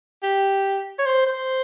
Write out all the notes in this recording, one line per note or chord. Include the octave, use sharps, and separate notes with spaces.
G4
C#5
C5
C5